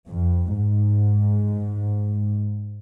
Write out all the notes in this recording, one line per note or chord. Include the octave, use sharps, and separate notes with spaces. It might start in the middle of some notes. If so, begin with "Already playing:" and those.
F2
G#2